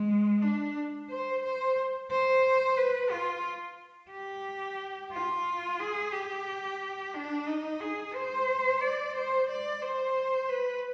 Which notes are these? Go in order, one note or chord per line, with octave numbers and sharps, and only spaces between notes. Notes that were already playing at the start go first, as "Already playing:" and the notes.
Already playing: G#3
D4
C5
C5
C5
B4
F4
G4
F4
G#4
G4
D4
D#4
G#4
C5
D5
C5
D5
C5
B4